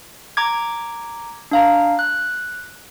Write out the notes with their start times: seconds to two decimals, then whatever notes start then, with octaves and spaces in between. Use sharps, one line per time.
0.37 A#5 D6 G#6
1.51 D4 F5 A#5
1.99 F#6